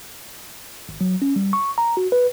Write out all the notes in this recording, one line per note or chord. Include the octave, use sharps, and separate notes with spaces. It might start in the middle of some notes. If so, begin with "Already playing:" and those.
G#1
F#3
C#4
G3
C#6
A#5
F#4
B4